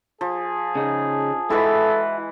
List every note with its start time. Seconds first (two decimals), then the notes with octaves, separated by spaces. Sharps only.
0.21 F3 G#4
0.75 C#3 D#4
1.50 E3 G#3 E4 F#4 A4 B4 E5